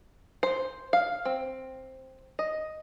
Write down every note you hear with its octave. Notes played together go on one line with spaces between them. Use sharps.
C5
F5
C4
D#5